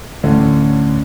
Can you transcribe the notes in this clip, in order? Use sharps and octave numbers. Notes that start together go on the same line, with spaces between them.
D2 A2 D3 C#4